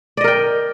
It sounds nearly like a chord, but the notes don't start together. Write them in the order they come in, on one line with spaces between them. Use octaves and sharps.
D5 D#5 A#4 G5